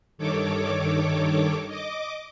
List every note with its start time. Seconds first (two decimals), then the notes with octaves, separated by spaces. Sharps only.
0.18 G2 D#3 A4 C#5 D6
1.67 D#5 D6